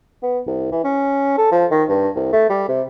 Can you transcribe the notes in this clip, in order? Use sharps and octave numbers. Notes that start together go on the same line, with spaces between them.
B3
C2
E3
C#4
A4
F3
D#3
G2
C2
A3
G3
C3